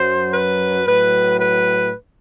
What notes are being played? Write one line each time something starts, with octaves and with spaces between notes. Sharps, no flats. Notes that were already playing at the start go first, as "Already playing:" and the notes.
Already playing: F#2 F#3 C5
B4
A2 F#3 B4
B4